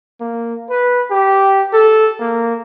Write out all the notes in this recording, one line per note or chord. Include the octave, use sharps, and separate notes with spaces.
A#3
B4
G4
A4
A#3